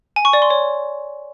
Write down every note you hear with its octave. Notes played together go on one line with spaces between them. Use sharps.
G#5
C#6
D5
C6
C#5